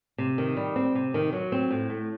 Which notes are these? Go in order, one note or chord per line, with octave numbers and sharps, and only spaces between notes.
C3
D#3
G3
C4
C3
D#3
F#3
C4
A2
A3